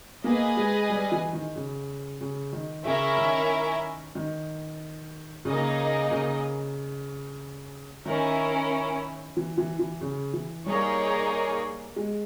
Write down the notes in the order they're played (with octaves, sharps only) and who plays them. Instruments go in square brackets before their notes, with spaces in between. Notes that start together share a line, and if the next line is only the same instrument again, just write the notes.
[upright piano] A#3 [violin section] G#4 B4 D#5 G#5
[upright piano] G#3
G3
E3
D#3
C#3
C#3
D#3
[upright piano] C#3 [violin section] C#4 E4 A#4 E5
[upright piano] D#3
D#3
[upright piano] C#3 [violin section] A#3 D#4 G#4 D#5
[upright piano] C#3
[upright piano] D#3 [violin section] C#4 E4 A#4
[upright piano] E3
E3
E3
C#3
E3
[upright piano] G3 [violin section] A#3 D#4 G#4 C#5
[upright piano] G#3